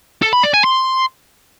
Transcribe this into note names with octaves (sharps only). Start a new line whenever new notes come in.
A4
B5
D5
G#5
C6